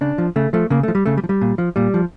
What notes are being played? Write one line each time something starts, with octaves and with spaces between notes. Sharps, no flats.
C#3 D4
F3
C#3 A3
F3 A3
C#3 A#3
A3
F3
G3
C#3 A3
G3
F3
G3
A#2
F3
A#2 G3
F3